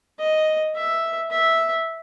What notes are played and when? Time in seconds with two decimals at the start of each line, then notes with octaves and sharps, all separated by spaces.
0.19 D#5
0.76 E5
1.31 E5